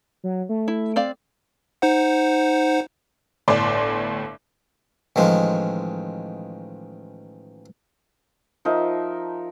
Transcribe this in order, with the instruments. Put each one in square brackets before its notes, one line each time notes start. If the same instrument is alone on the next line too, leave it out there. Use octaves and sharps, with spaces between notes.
[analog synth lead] F#3
A3
[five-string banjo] E4
C4 D5 F5
[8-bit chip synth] D#4 C5 F#5
[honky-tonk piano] G1 A2 D5 G#5 C6 D6
[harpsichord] A1 D#3 F3 G#3
[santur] F3 D#4 A#4 E5